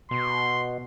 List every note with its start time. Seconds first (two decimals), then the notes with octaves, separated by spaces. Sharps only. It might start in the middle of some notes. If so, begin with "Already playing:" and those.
0.11 B2 C6